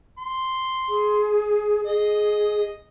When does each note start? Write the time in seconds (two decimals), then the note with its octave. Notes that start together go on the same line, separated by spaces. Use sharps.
0.19 C6
0.89 G#4
1.87 G#4 D#5